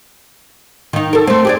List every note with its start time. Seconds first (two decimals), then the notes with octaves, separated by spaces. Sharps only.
0.93 D#3 D#4
1.13 A4 A#4
1.27 A3 C4
1.45 G4 G#4 D5